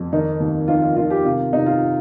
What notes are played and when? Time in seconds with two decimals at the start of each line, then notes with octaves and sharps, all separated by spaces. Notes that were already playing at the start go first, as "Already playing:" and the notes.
Already playing: F2
0.13 D#3 D#4
0.40 D#2
0.68 D#3 F4
0.82 F4
0.96 D#3 F4
1.10 G4
1.24 C3 F4
1.53 C3 D#4
1.66 F4